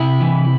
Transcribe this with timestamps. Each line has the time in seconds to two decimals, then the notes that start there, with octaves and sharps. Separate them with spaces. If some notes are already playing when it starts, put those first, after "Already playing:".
Already playing: C3 E4
0.21 E3